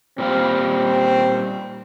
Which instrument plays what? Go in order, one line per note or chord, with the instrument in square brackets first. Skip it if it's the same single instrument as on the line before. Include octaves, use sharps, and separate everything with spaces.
[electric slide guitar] A#2 G3 F5 [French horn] C4